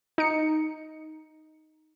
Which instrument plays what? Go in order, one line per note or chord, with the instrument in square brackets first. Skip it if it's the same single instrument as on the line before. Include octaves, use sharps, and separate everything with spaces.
[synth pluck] D#4 C#7